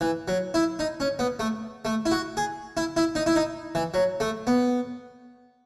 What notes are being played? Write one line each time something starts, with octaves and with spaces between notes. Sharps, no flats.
E3
F#3
E4
D#4
C#4
B3
A3
A3
E4
F#4
G#4
E4
E4
D#4
E4
D#4
E3
F#3
A3
B3